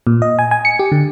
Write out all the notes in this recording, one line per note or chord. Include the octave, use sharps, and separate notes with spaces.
A#2
D#5
G#5
G#5
C#7
G4
D3